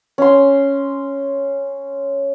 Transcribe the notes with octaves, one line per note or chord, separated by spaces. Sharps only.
C#4 C6